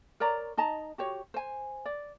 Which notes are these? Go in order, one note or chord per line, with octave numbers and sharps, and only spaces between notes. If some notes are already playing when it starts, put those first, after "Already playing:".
A#4 C#5 D5 A#5
D#4 D#5 A5 A#5
F#4 G4 C#5
C5 G#5
D5